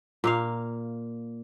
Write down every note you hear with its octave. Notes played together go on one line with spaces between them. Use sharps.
A#2 A#3 F5